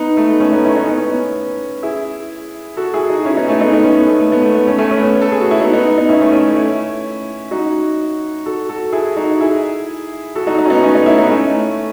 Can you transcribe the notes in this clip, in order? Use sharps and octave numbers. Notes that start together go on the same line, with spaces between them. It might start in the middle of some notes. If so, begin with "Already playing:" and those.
Already playing: B3 D#4
A3
B3
A3 C#4
B3 D#4
C#4 E4
B3 D#4
B3
C#4
B3
E4 G#4
F#4 A4
E4 G#4
D#4 F#4
C#4 E4
B3 D#4
A3 C#4
B3 D#4
B3 D#4
A3 C#4
B3
A3
A3
B3
A3
B3
A3 C#4
A3 C#4
A3 C#4
B3
A3 C#4
A4
G#4
F#4
E4
B3 D#4
B3 D#4
B3 D#4
C#4 E4
A3 C#4
A3 C#4
C#4 E4
D#4 F#4
F#4 A4
F#4 A4
E4 G#4
D#4 F#4
E4 G#4
F#4 A4
D#4 F#4
D#4 F#4
C#4
B3 D#4
A3 C#4
B3 D#4
C#4 E4
B3 D#4
A3 C#4